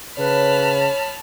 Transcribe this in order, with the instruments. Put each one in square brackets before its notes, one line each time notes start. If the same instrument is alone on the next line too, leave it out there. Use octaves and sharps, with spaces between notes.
[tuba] C#3 [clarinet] B4 [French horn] C#5 [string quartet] A5 B5 F6